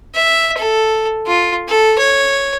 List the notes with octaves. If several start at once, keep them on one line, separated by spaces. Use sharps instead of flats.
E5
A4
F4
A4
C#5